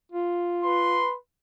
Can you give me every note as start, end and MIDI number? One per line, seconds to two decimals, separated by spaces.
0.12 1.05 65
0.64 1.16 71
0.64 1.16 84